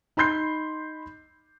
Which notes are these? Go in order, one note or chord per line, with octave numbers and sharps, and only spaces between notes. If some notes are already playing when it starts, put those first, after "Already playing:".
D#4 B5 C6 G6 C7